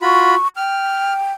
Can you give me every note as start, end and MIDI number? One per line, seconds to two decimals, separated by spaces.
0.02 0.35 65
0.02 0.35 66
0.02 0.35 83
0.02 0.48 85
0.57 1.33 79
0.57 1.13 89